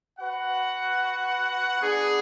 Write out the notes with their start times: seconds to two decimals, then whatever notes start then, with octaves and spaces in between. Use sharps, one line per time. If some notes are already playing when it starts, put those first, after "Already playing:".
0.20 F#4 B4 F#5
1.81 B3 D4 G#4